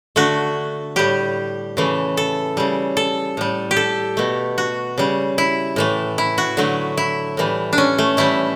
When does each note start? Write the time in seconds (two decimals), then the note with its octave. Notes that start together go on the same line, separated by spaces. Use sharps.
0.16 D3 A3 F#4
0.96 A2 G3 G4
1.77 C#3 E3 A3
2.17 A4
2.57 C#3 G3
2.97 A4
3.37 A2 G3
3.71 G4
3.77 A4
4.17 B2 A3
4.58 F#4
4.98 C#3 G3
5.38 E4
5.76 A2 E3 A3
6.18 E4
6.38 F#4
6.57 D3 F#3 A3
6.97 E4
7.37 A2 E3 G3
7.73 D4
7.78 C#4
7.98 A3
8.17 A2 E3 G3 E4